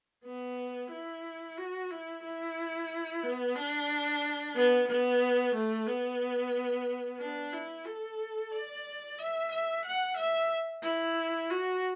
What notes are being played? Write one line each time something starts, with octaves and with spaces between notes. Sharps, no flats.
B3
E4
F#4
E4
E4
B3
D4
B3
B3
A3
B3
D4
E4
A4
D5
E5
E5
F#5
E5
E4
F#4